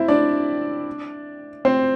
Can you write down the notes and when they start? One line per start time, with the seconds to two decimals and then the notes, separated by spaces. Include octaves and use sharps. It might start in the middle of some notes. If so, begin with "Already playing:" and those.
Already playing: C4 E4 E5
0.08 D4 D5
1.65 C4 C5